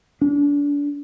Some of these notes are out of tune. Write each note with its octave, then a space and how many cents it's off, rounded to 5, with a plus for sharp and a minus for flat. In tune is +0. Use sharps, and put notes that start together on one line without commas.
D4 -30